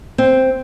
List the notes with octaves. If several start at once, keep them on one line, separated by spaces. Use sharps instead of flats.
C4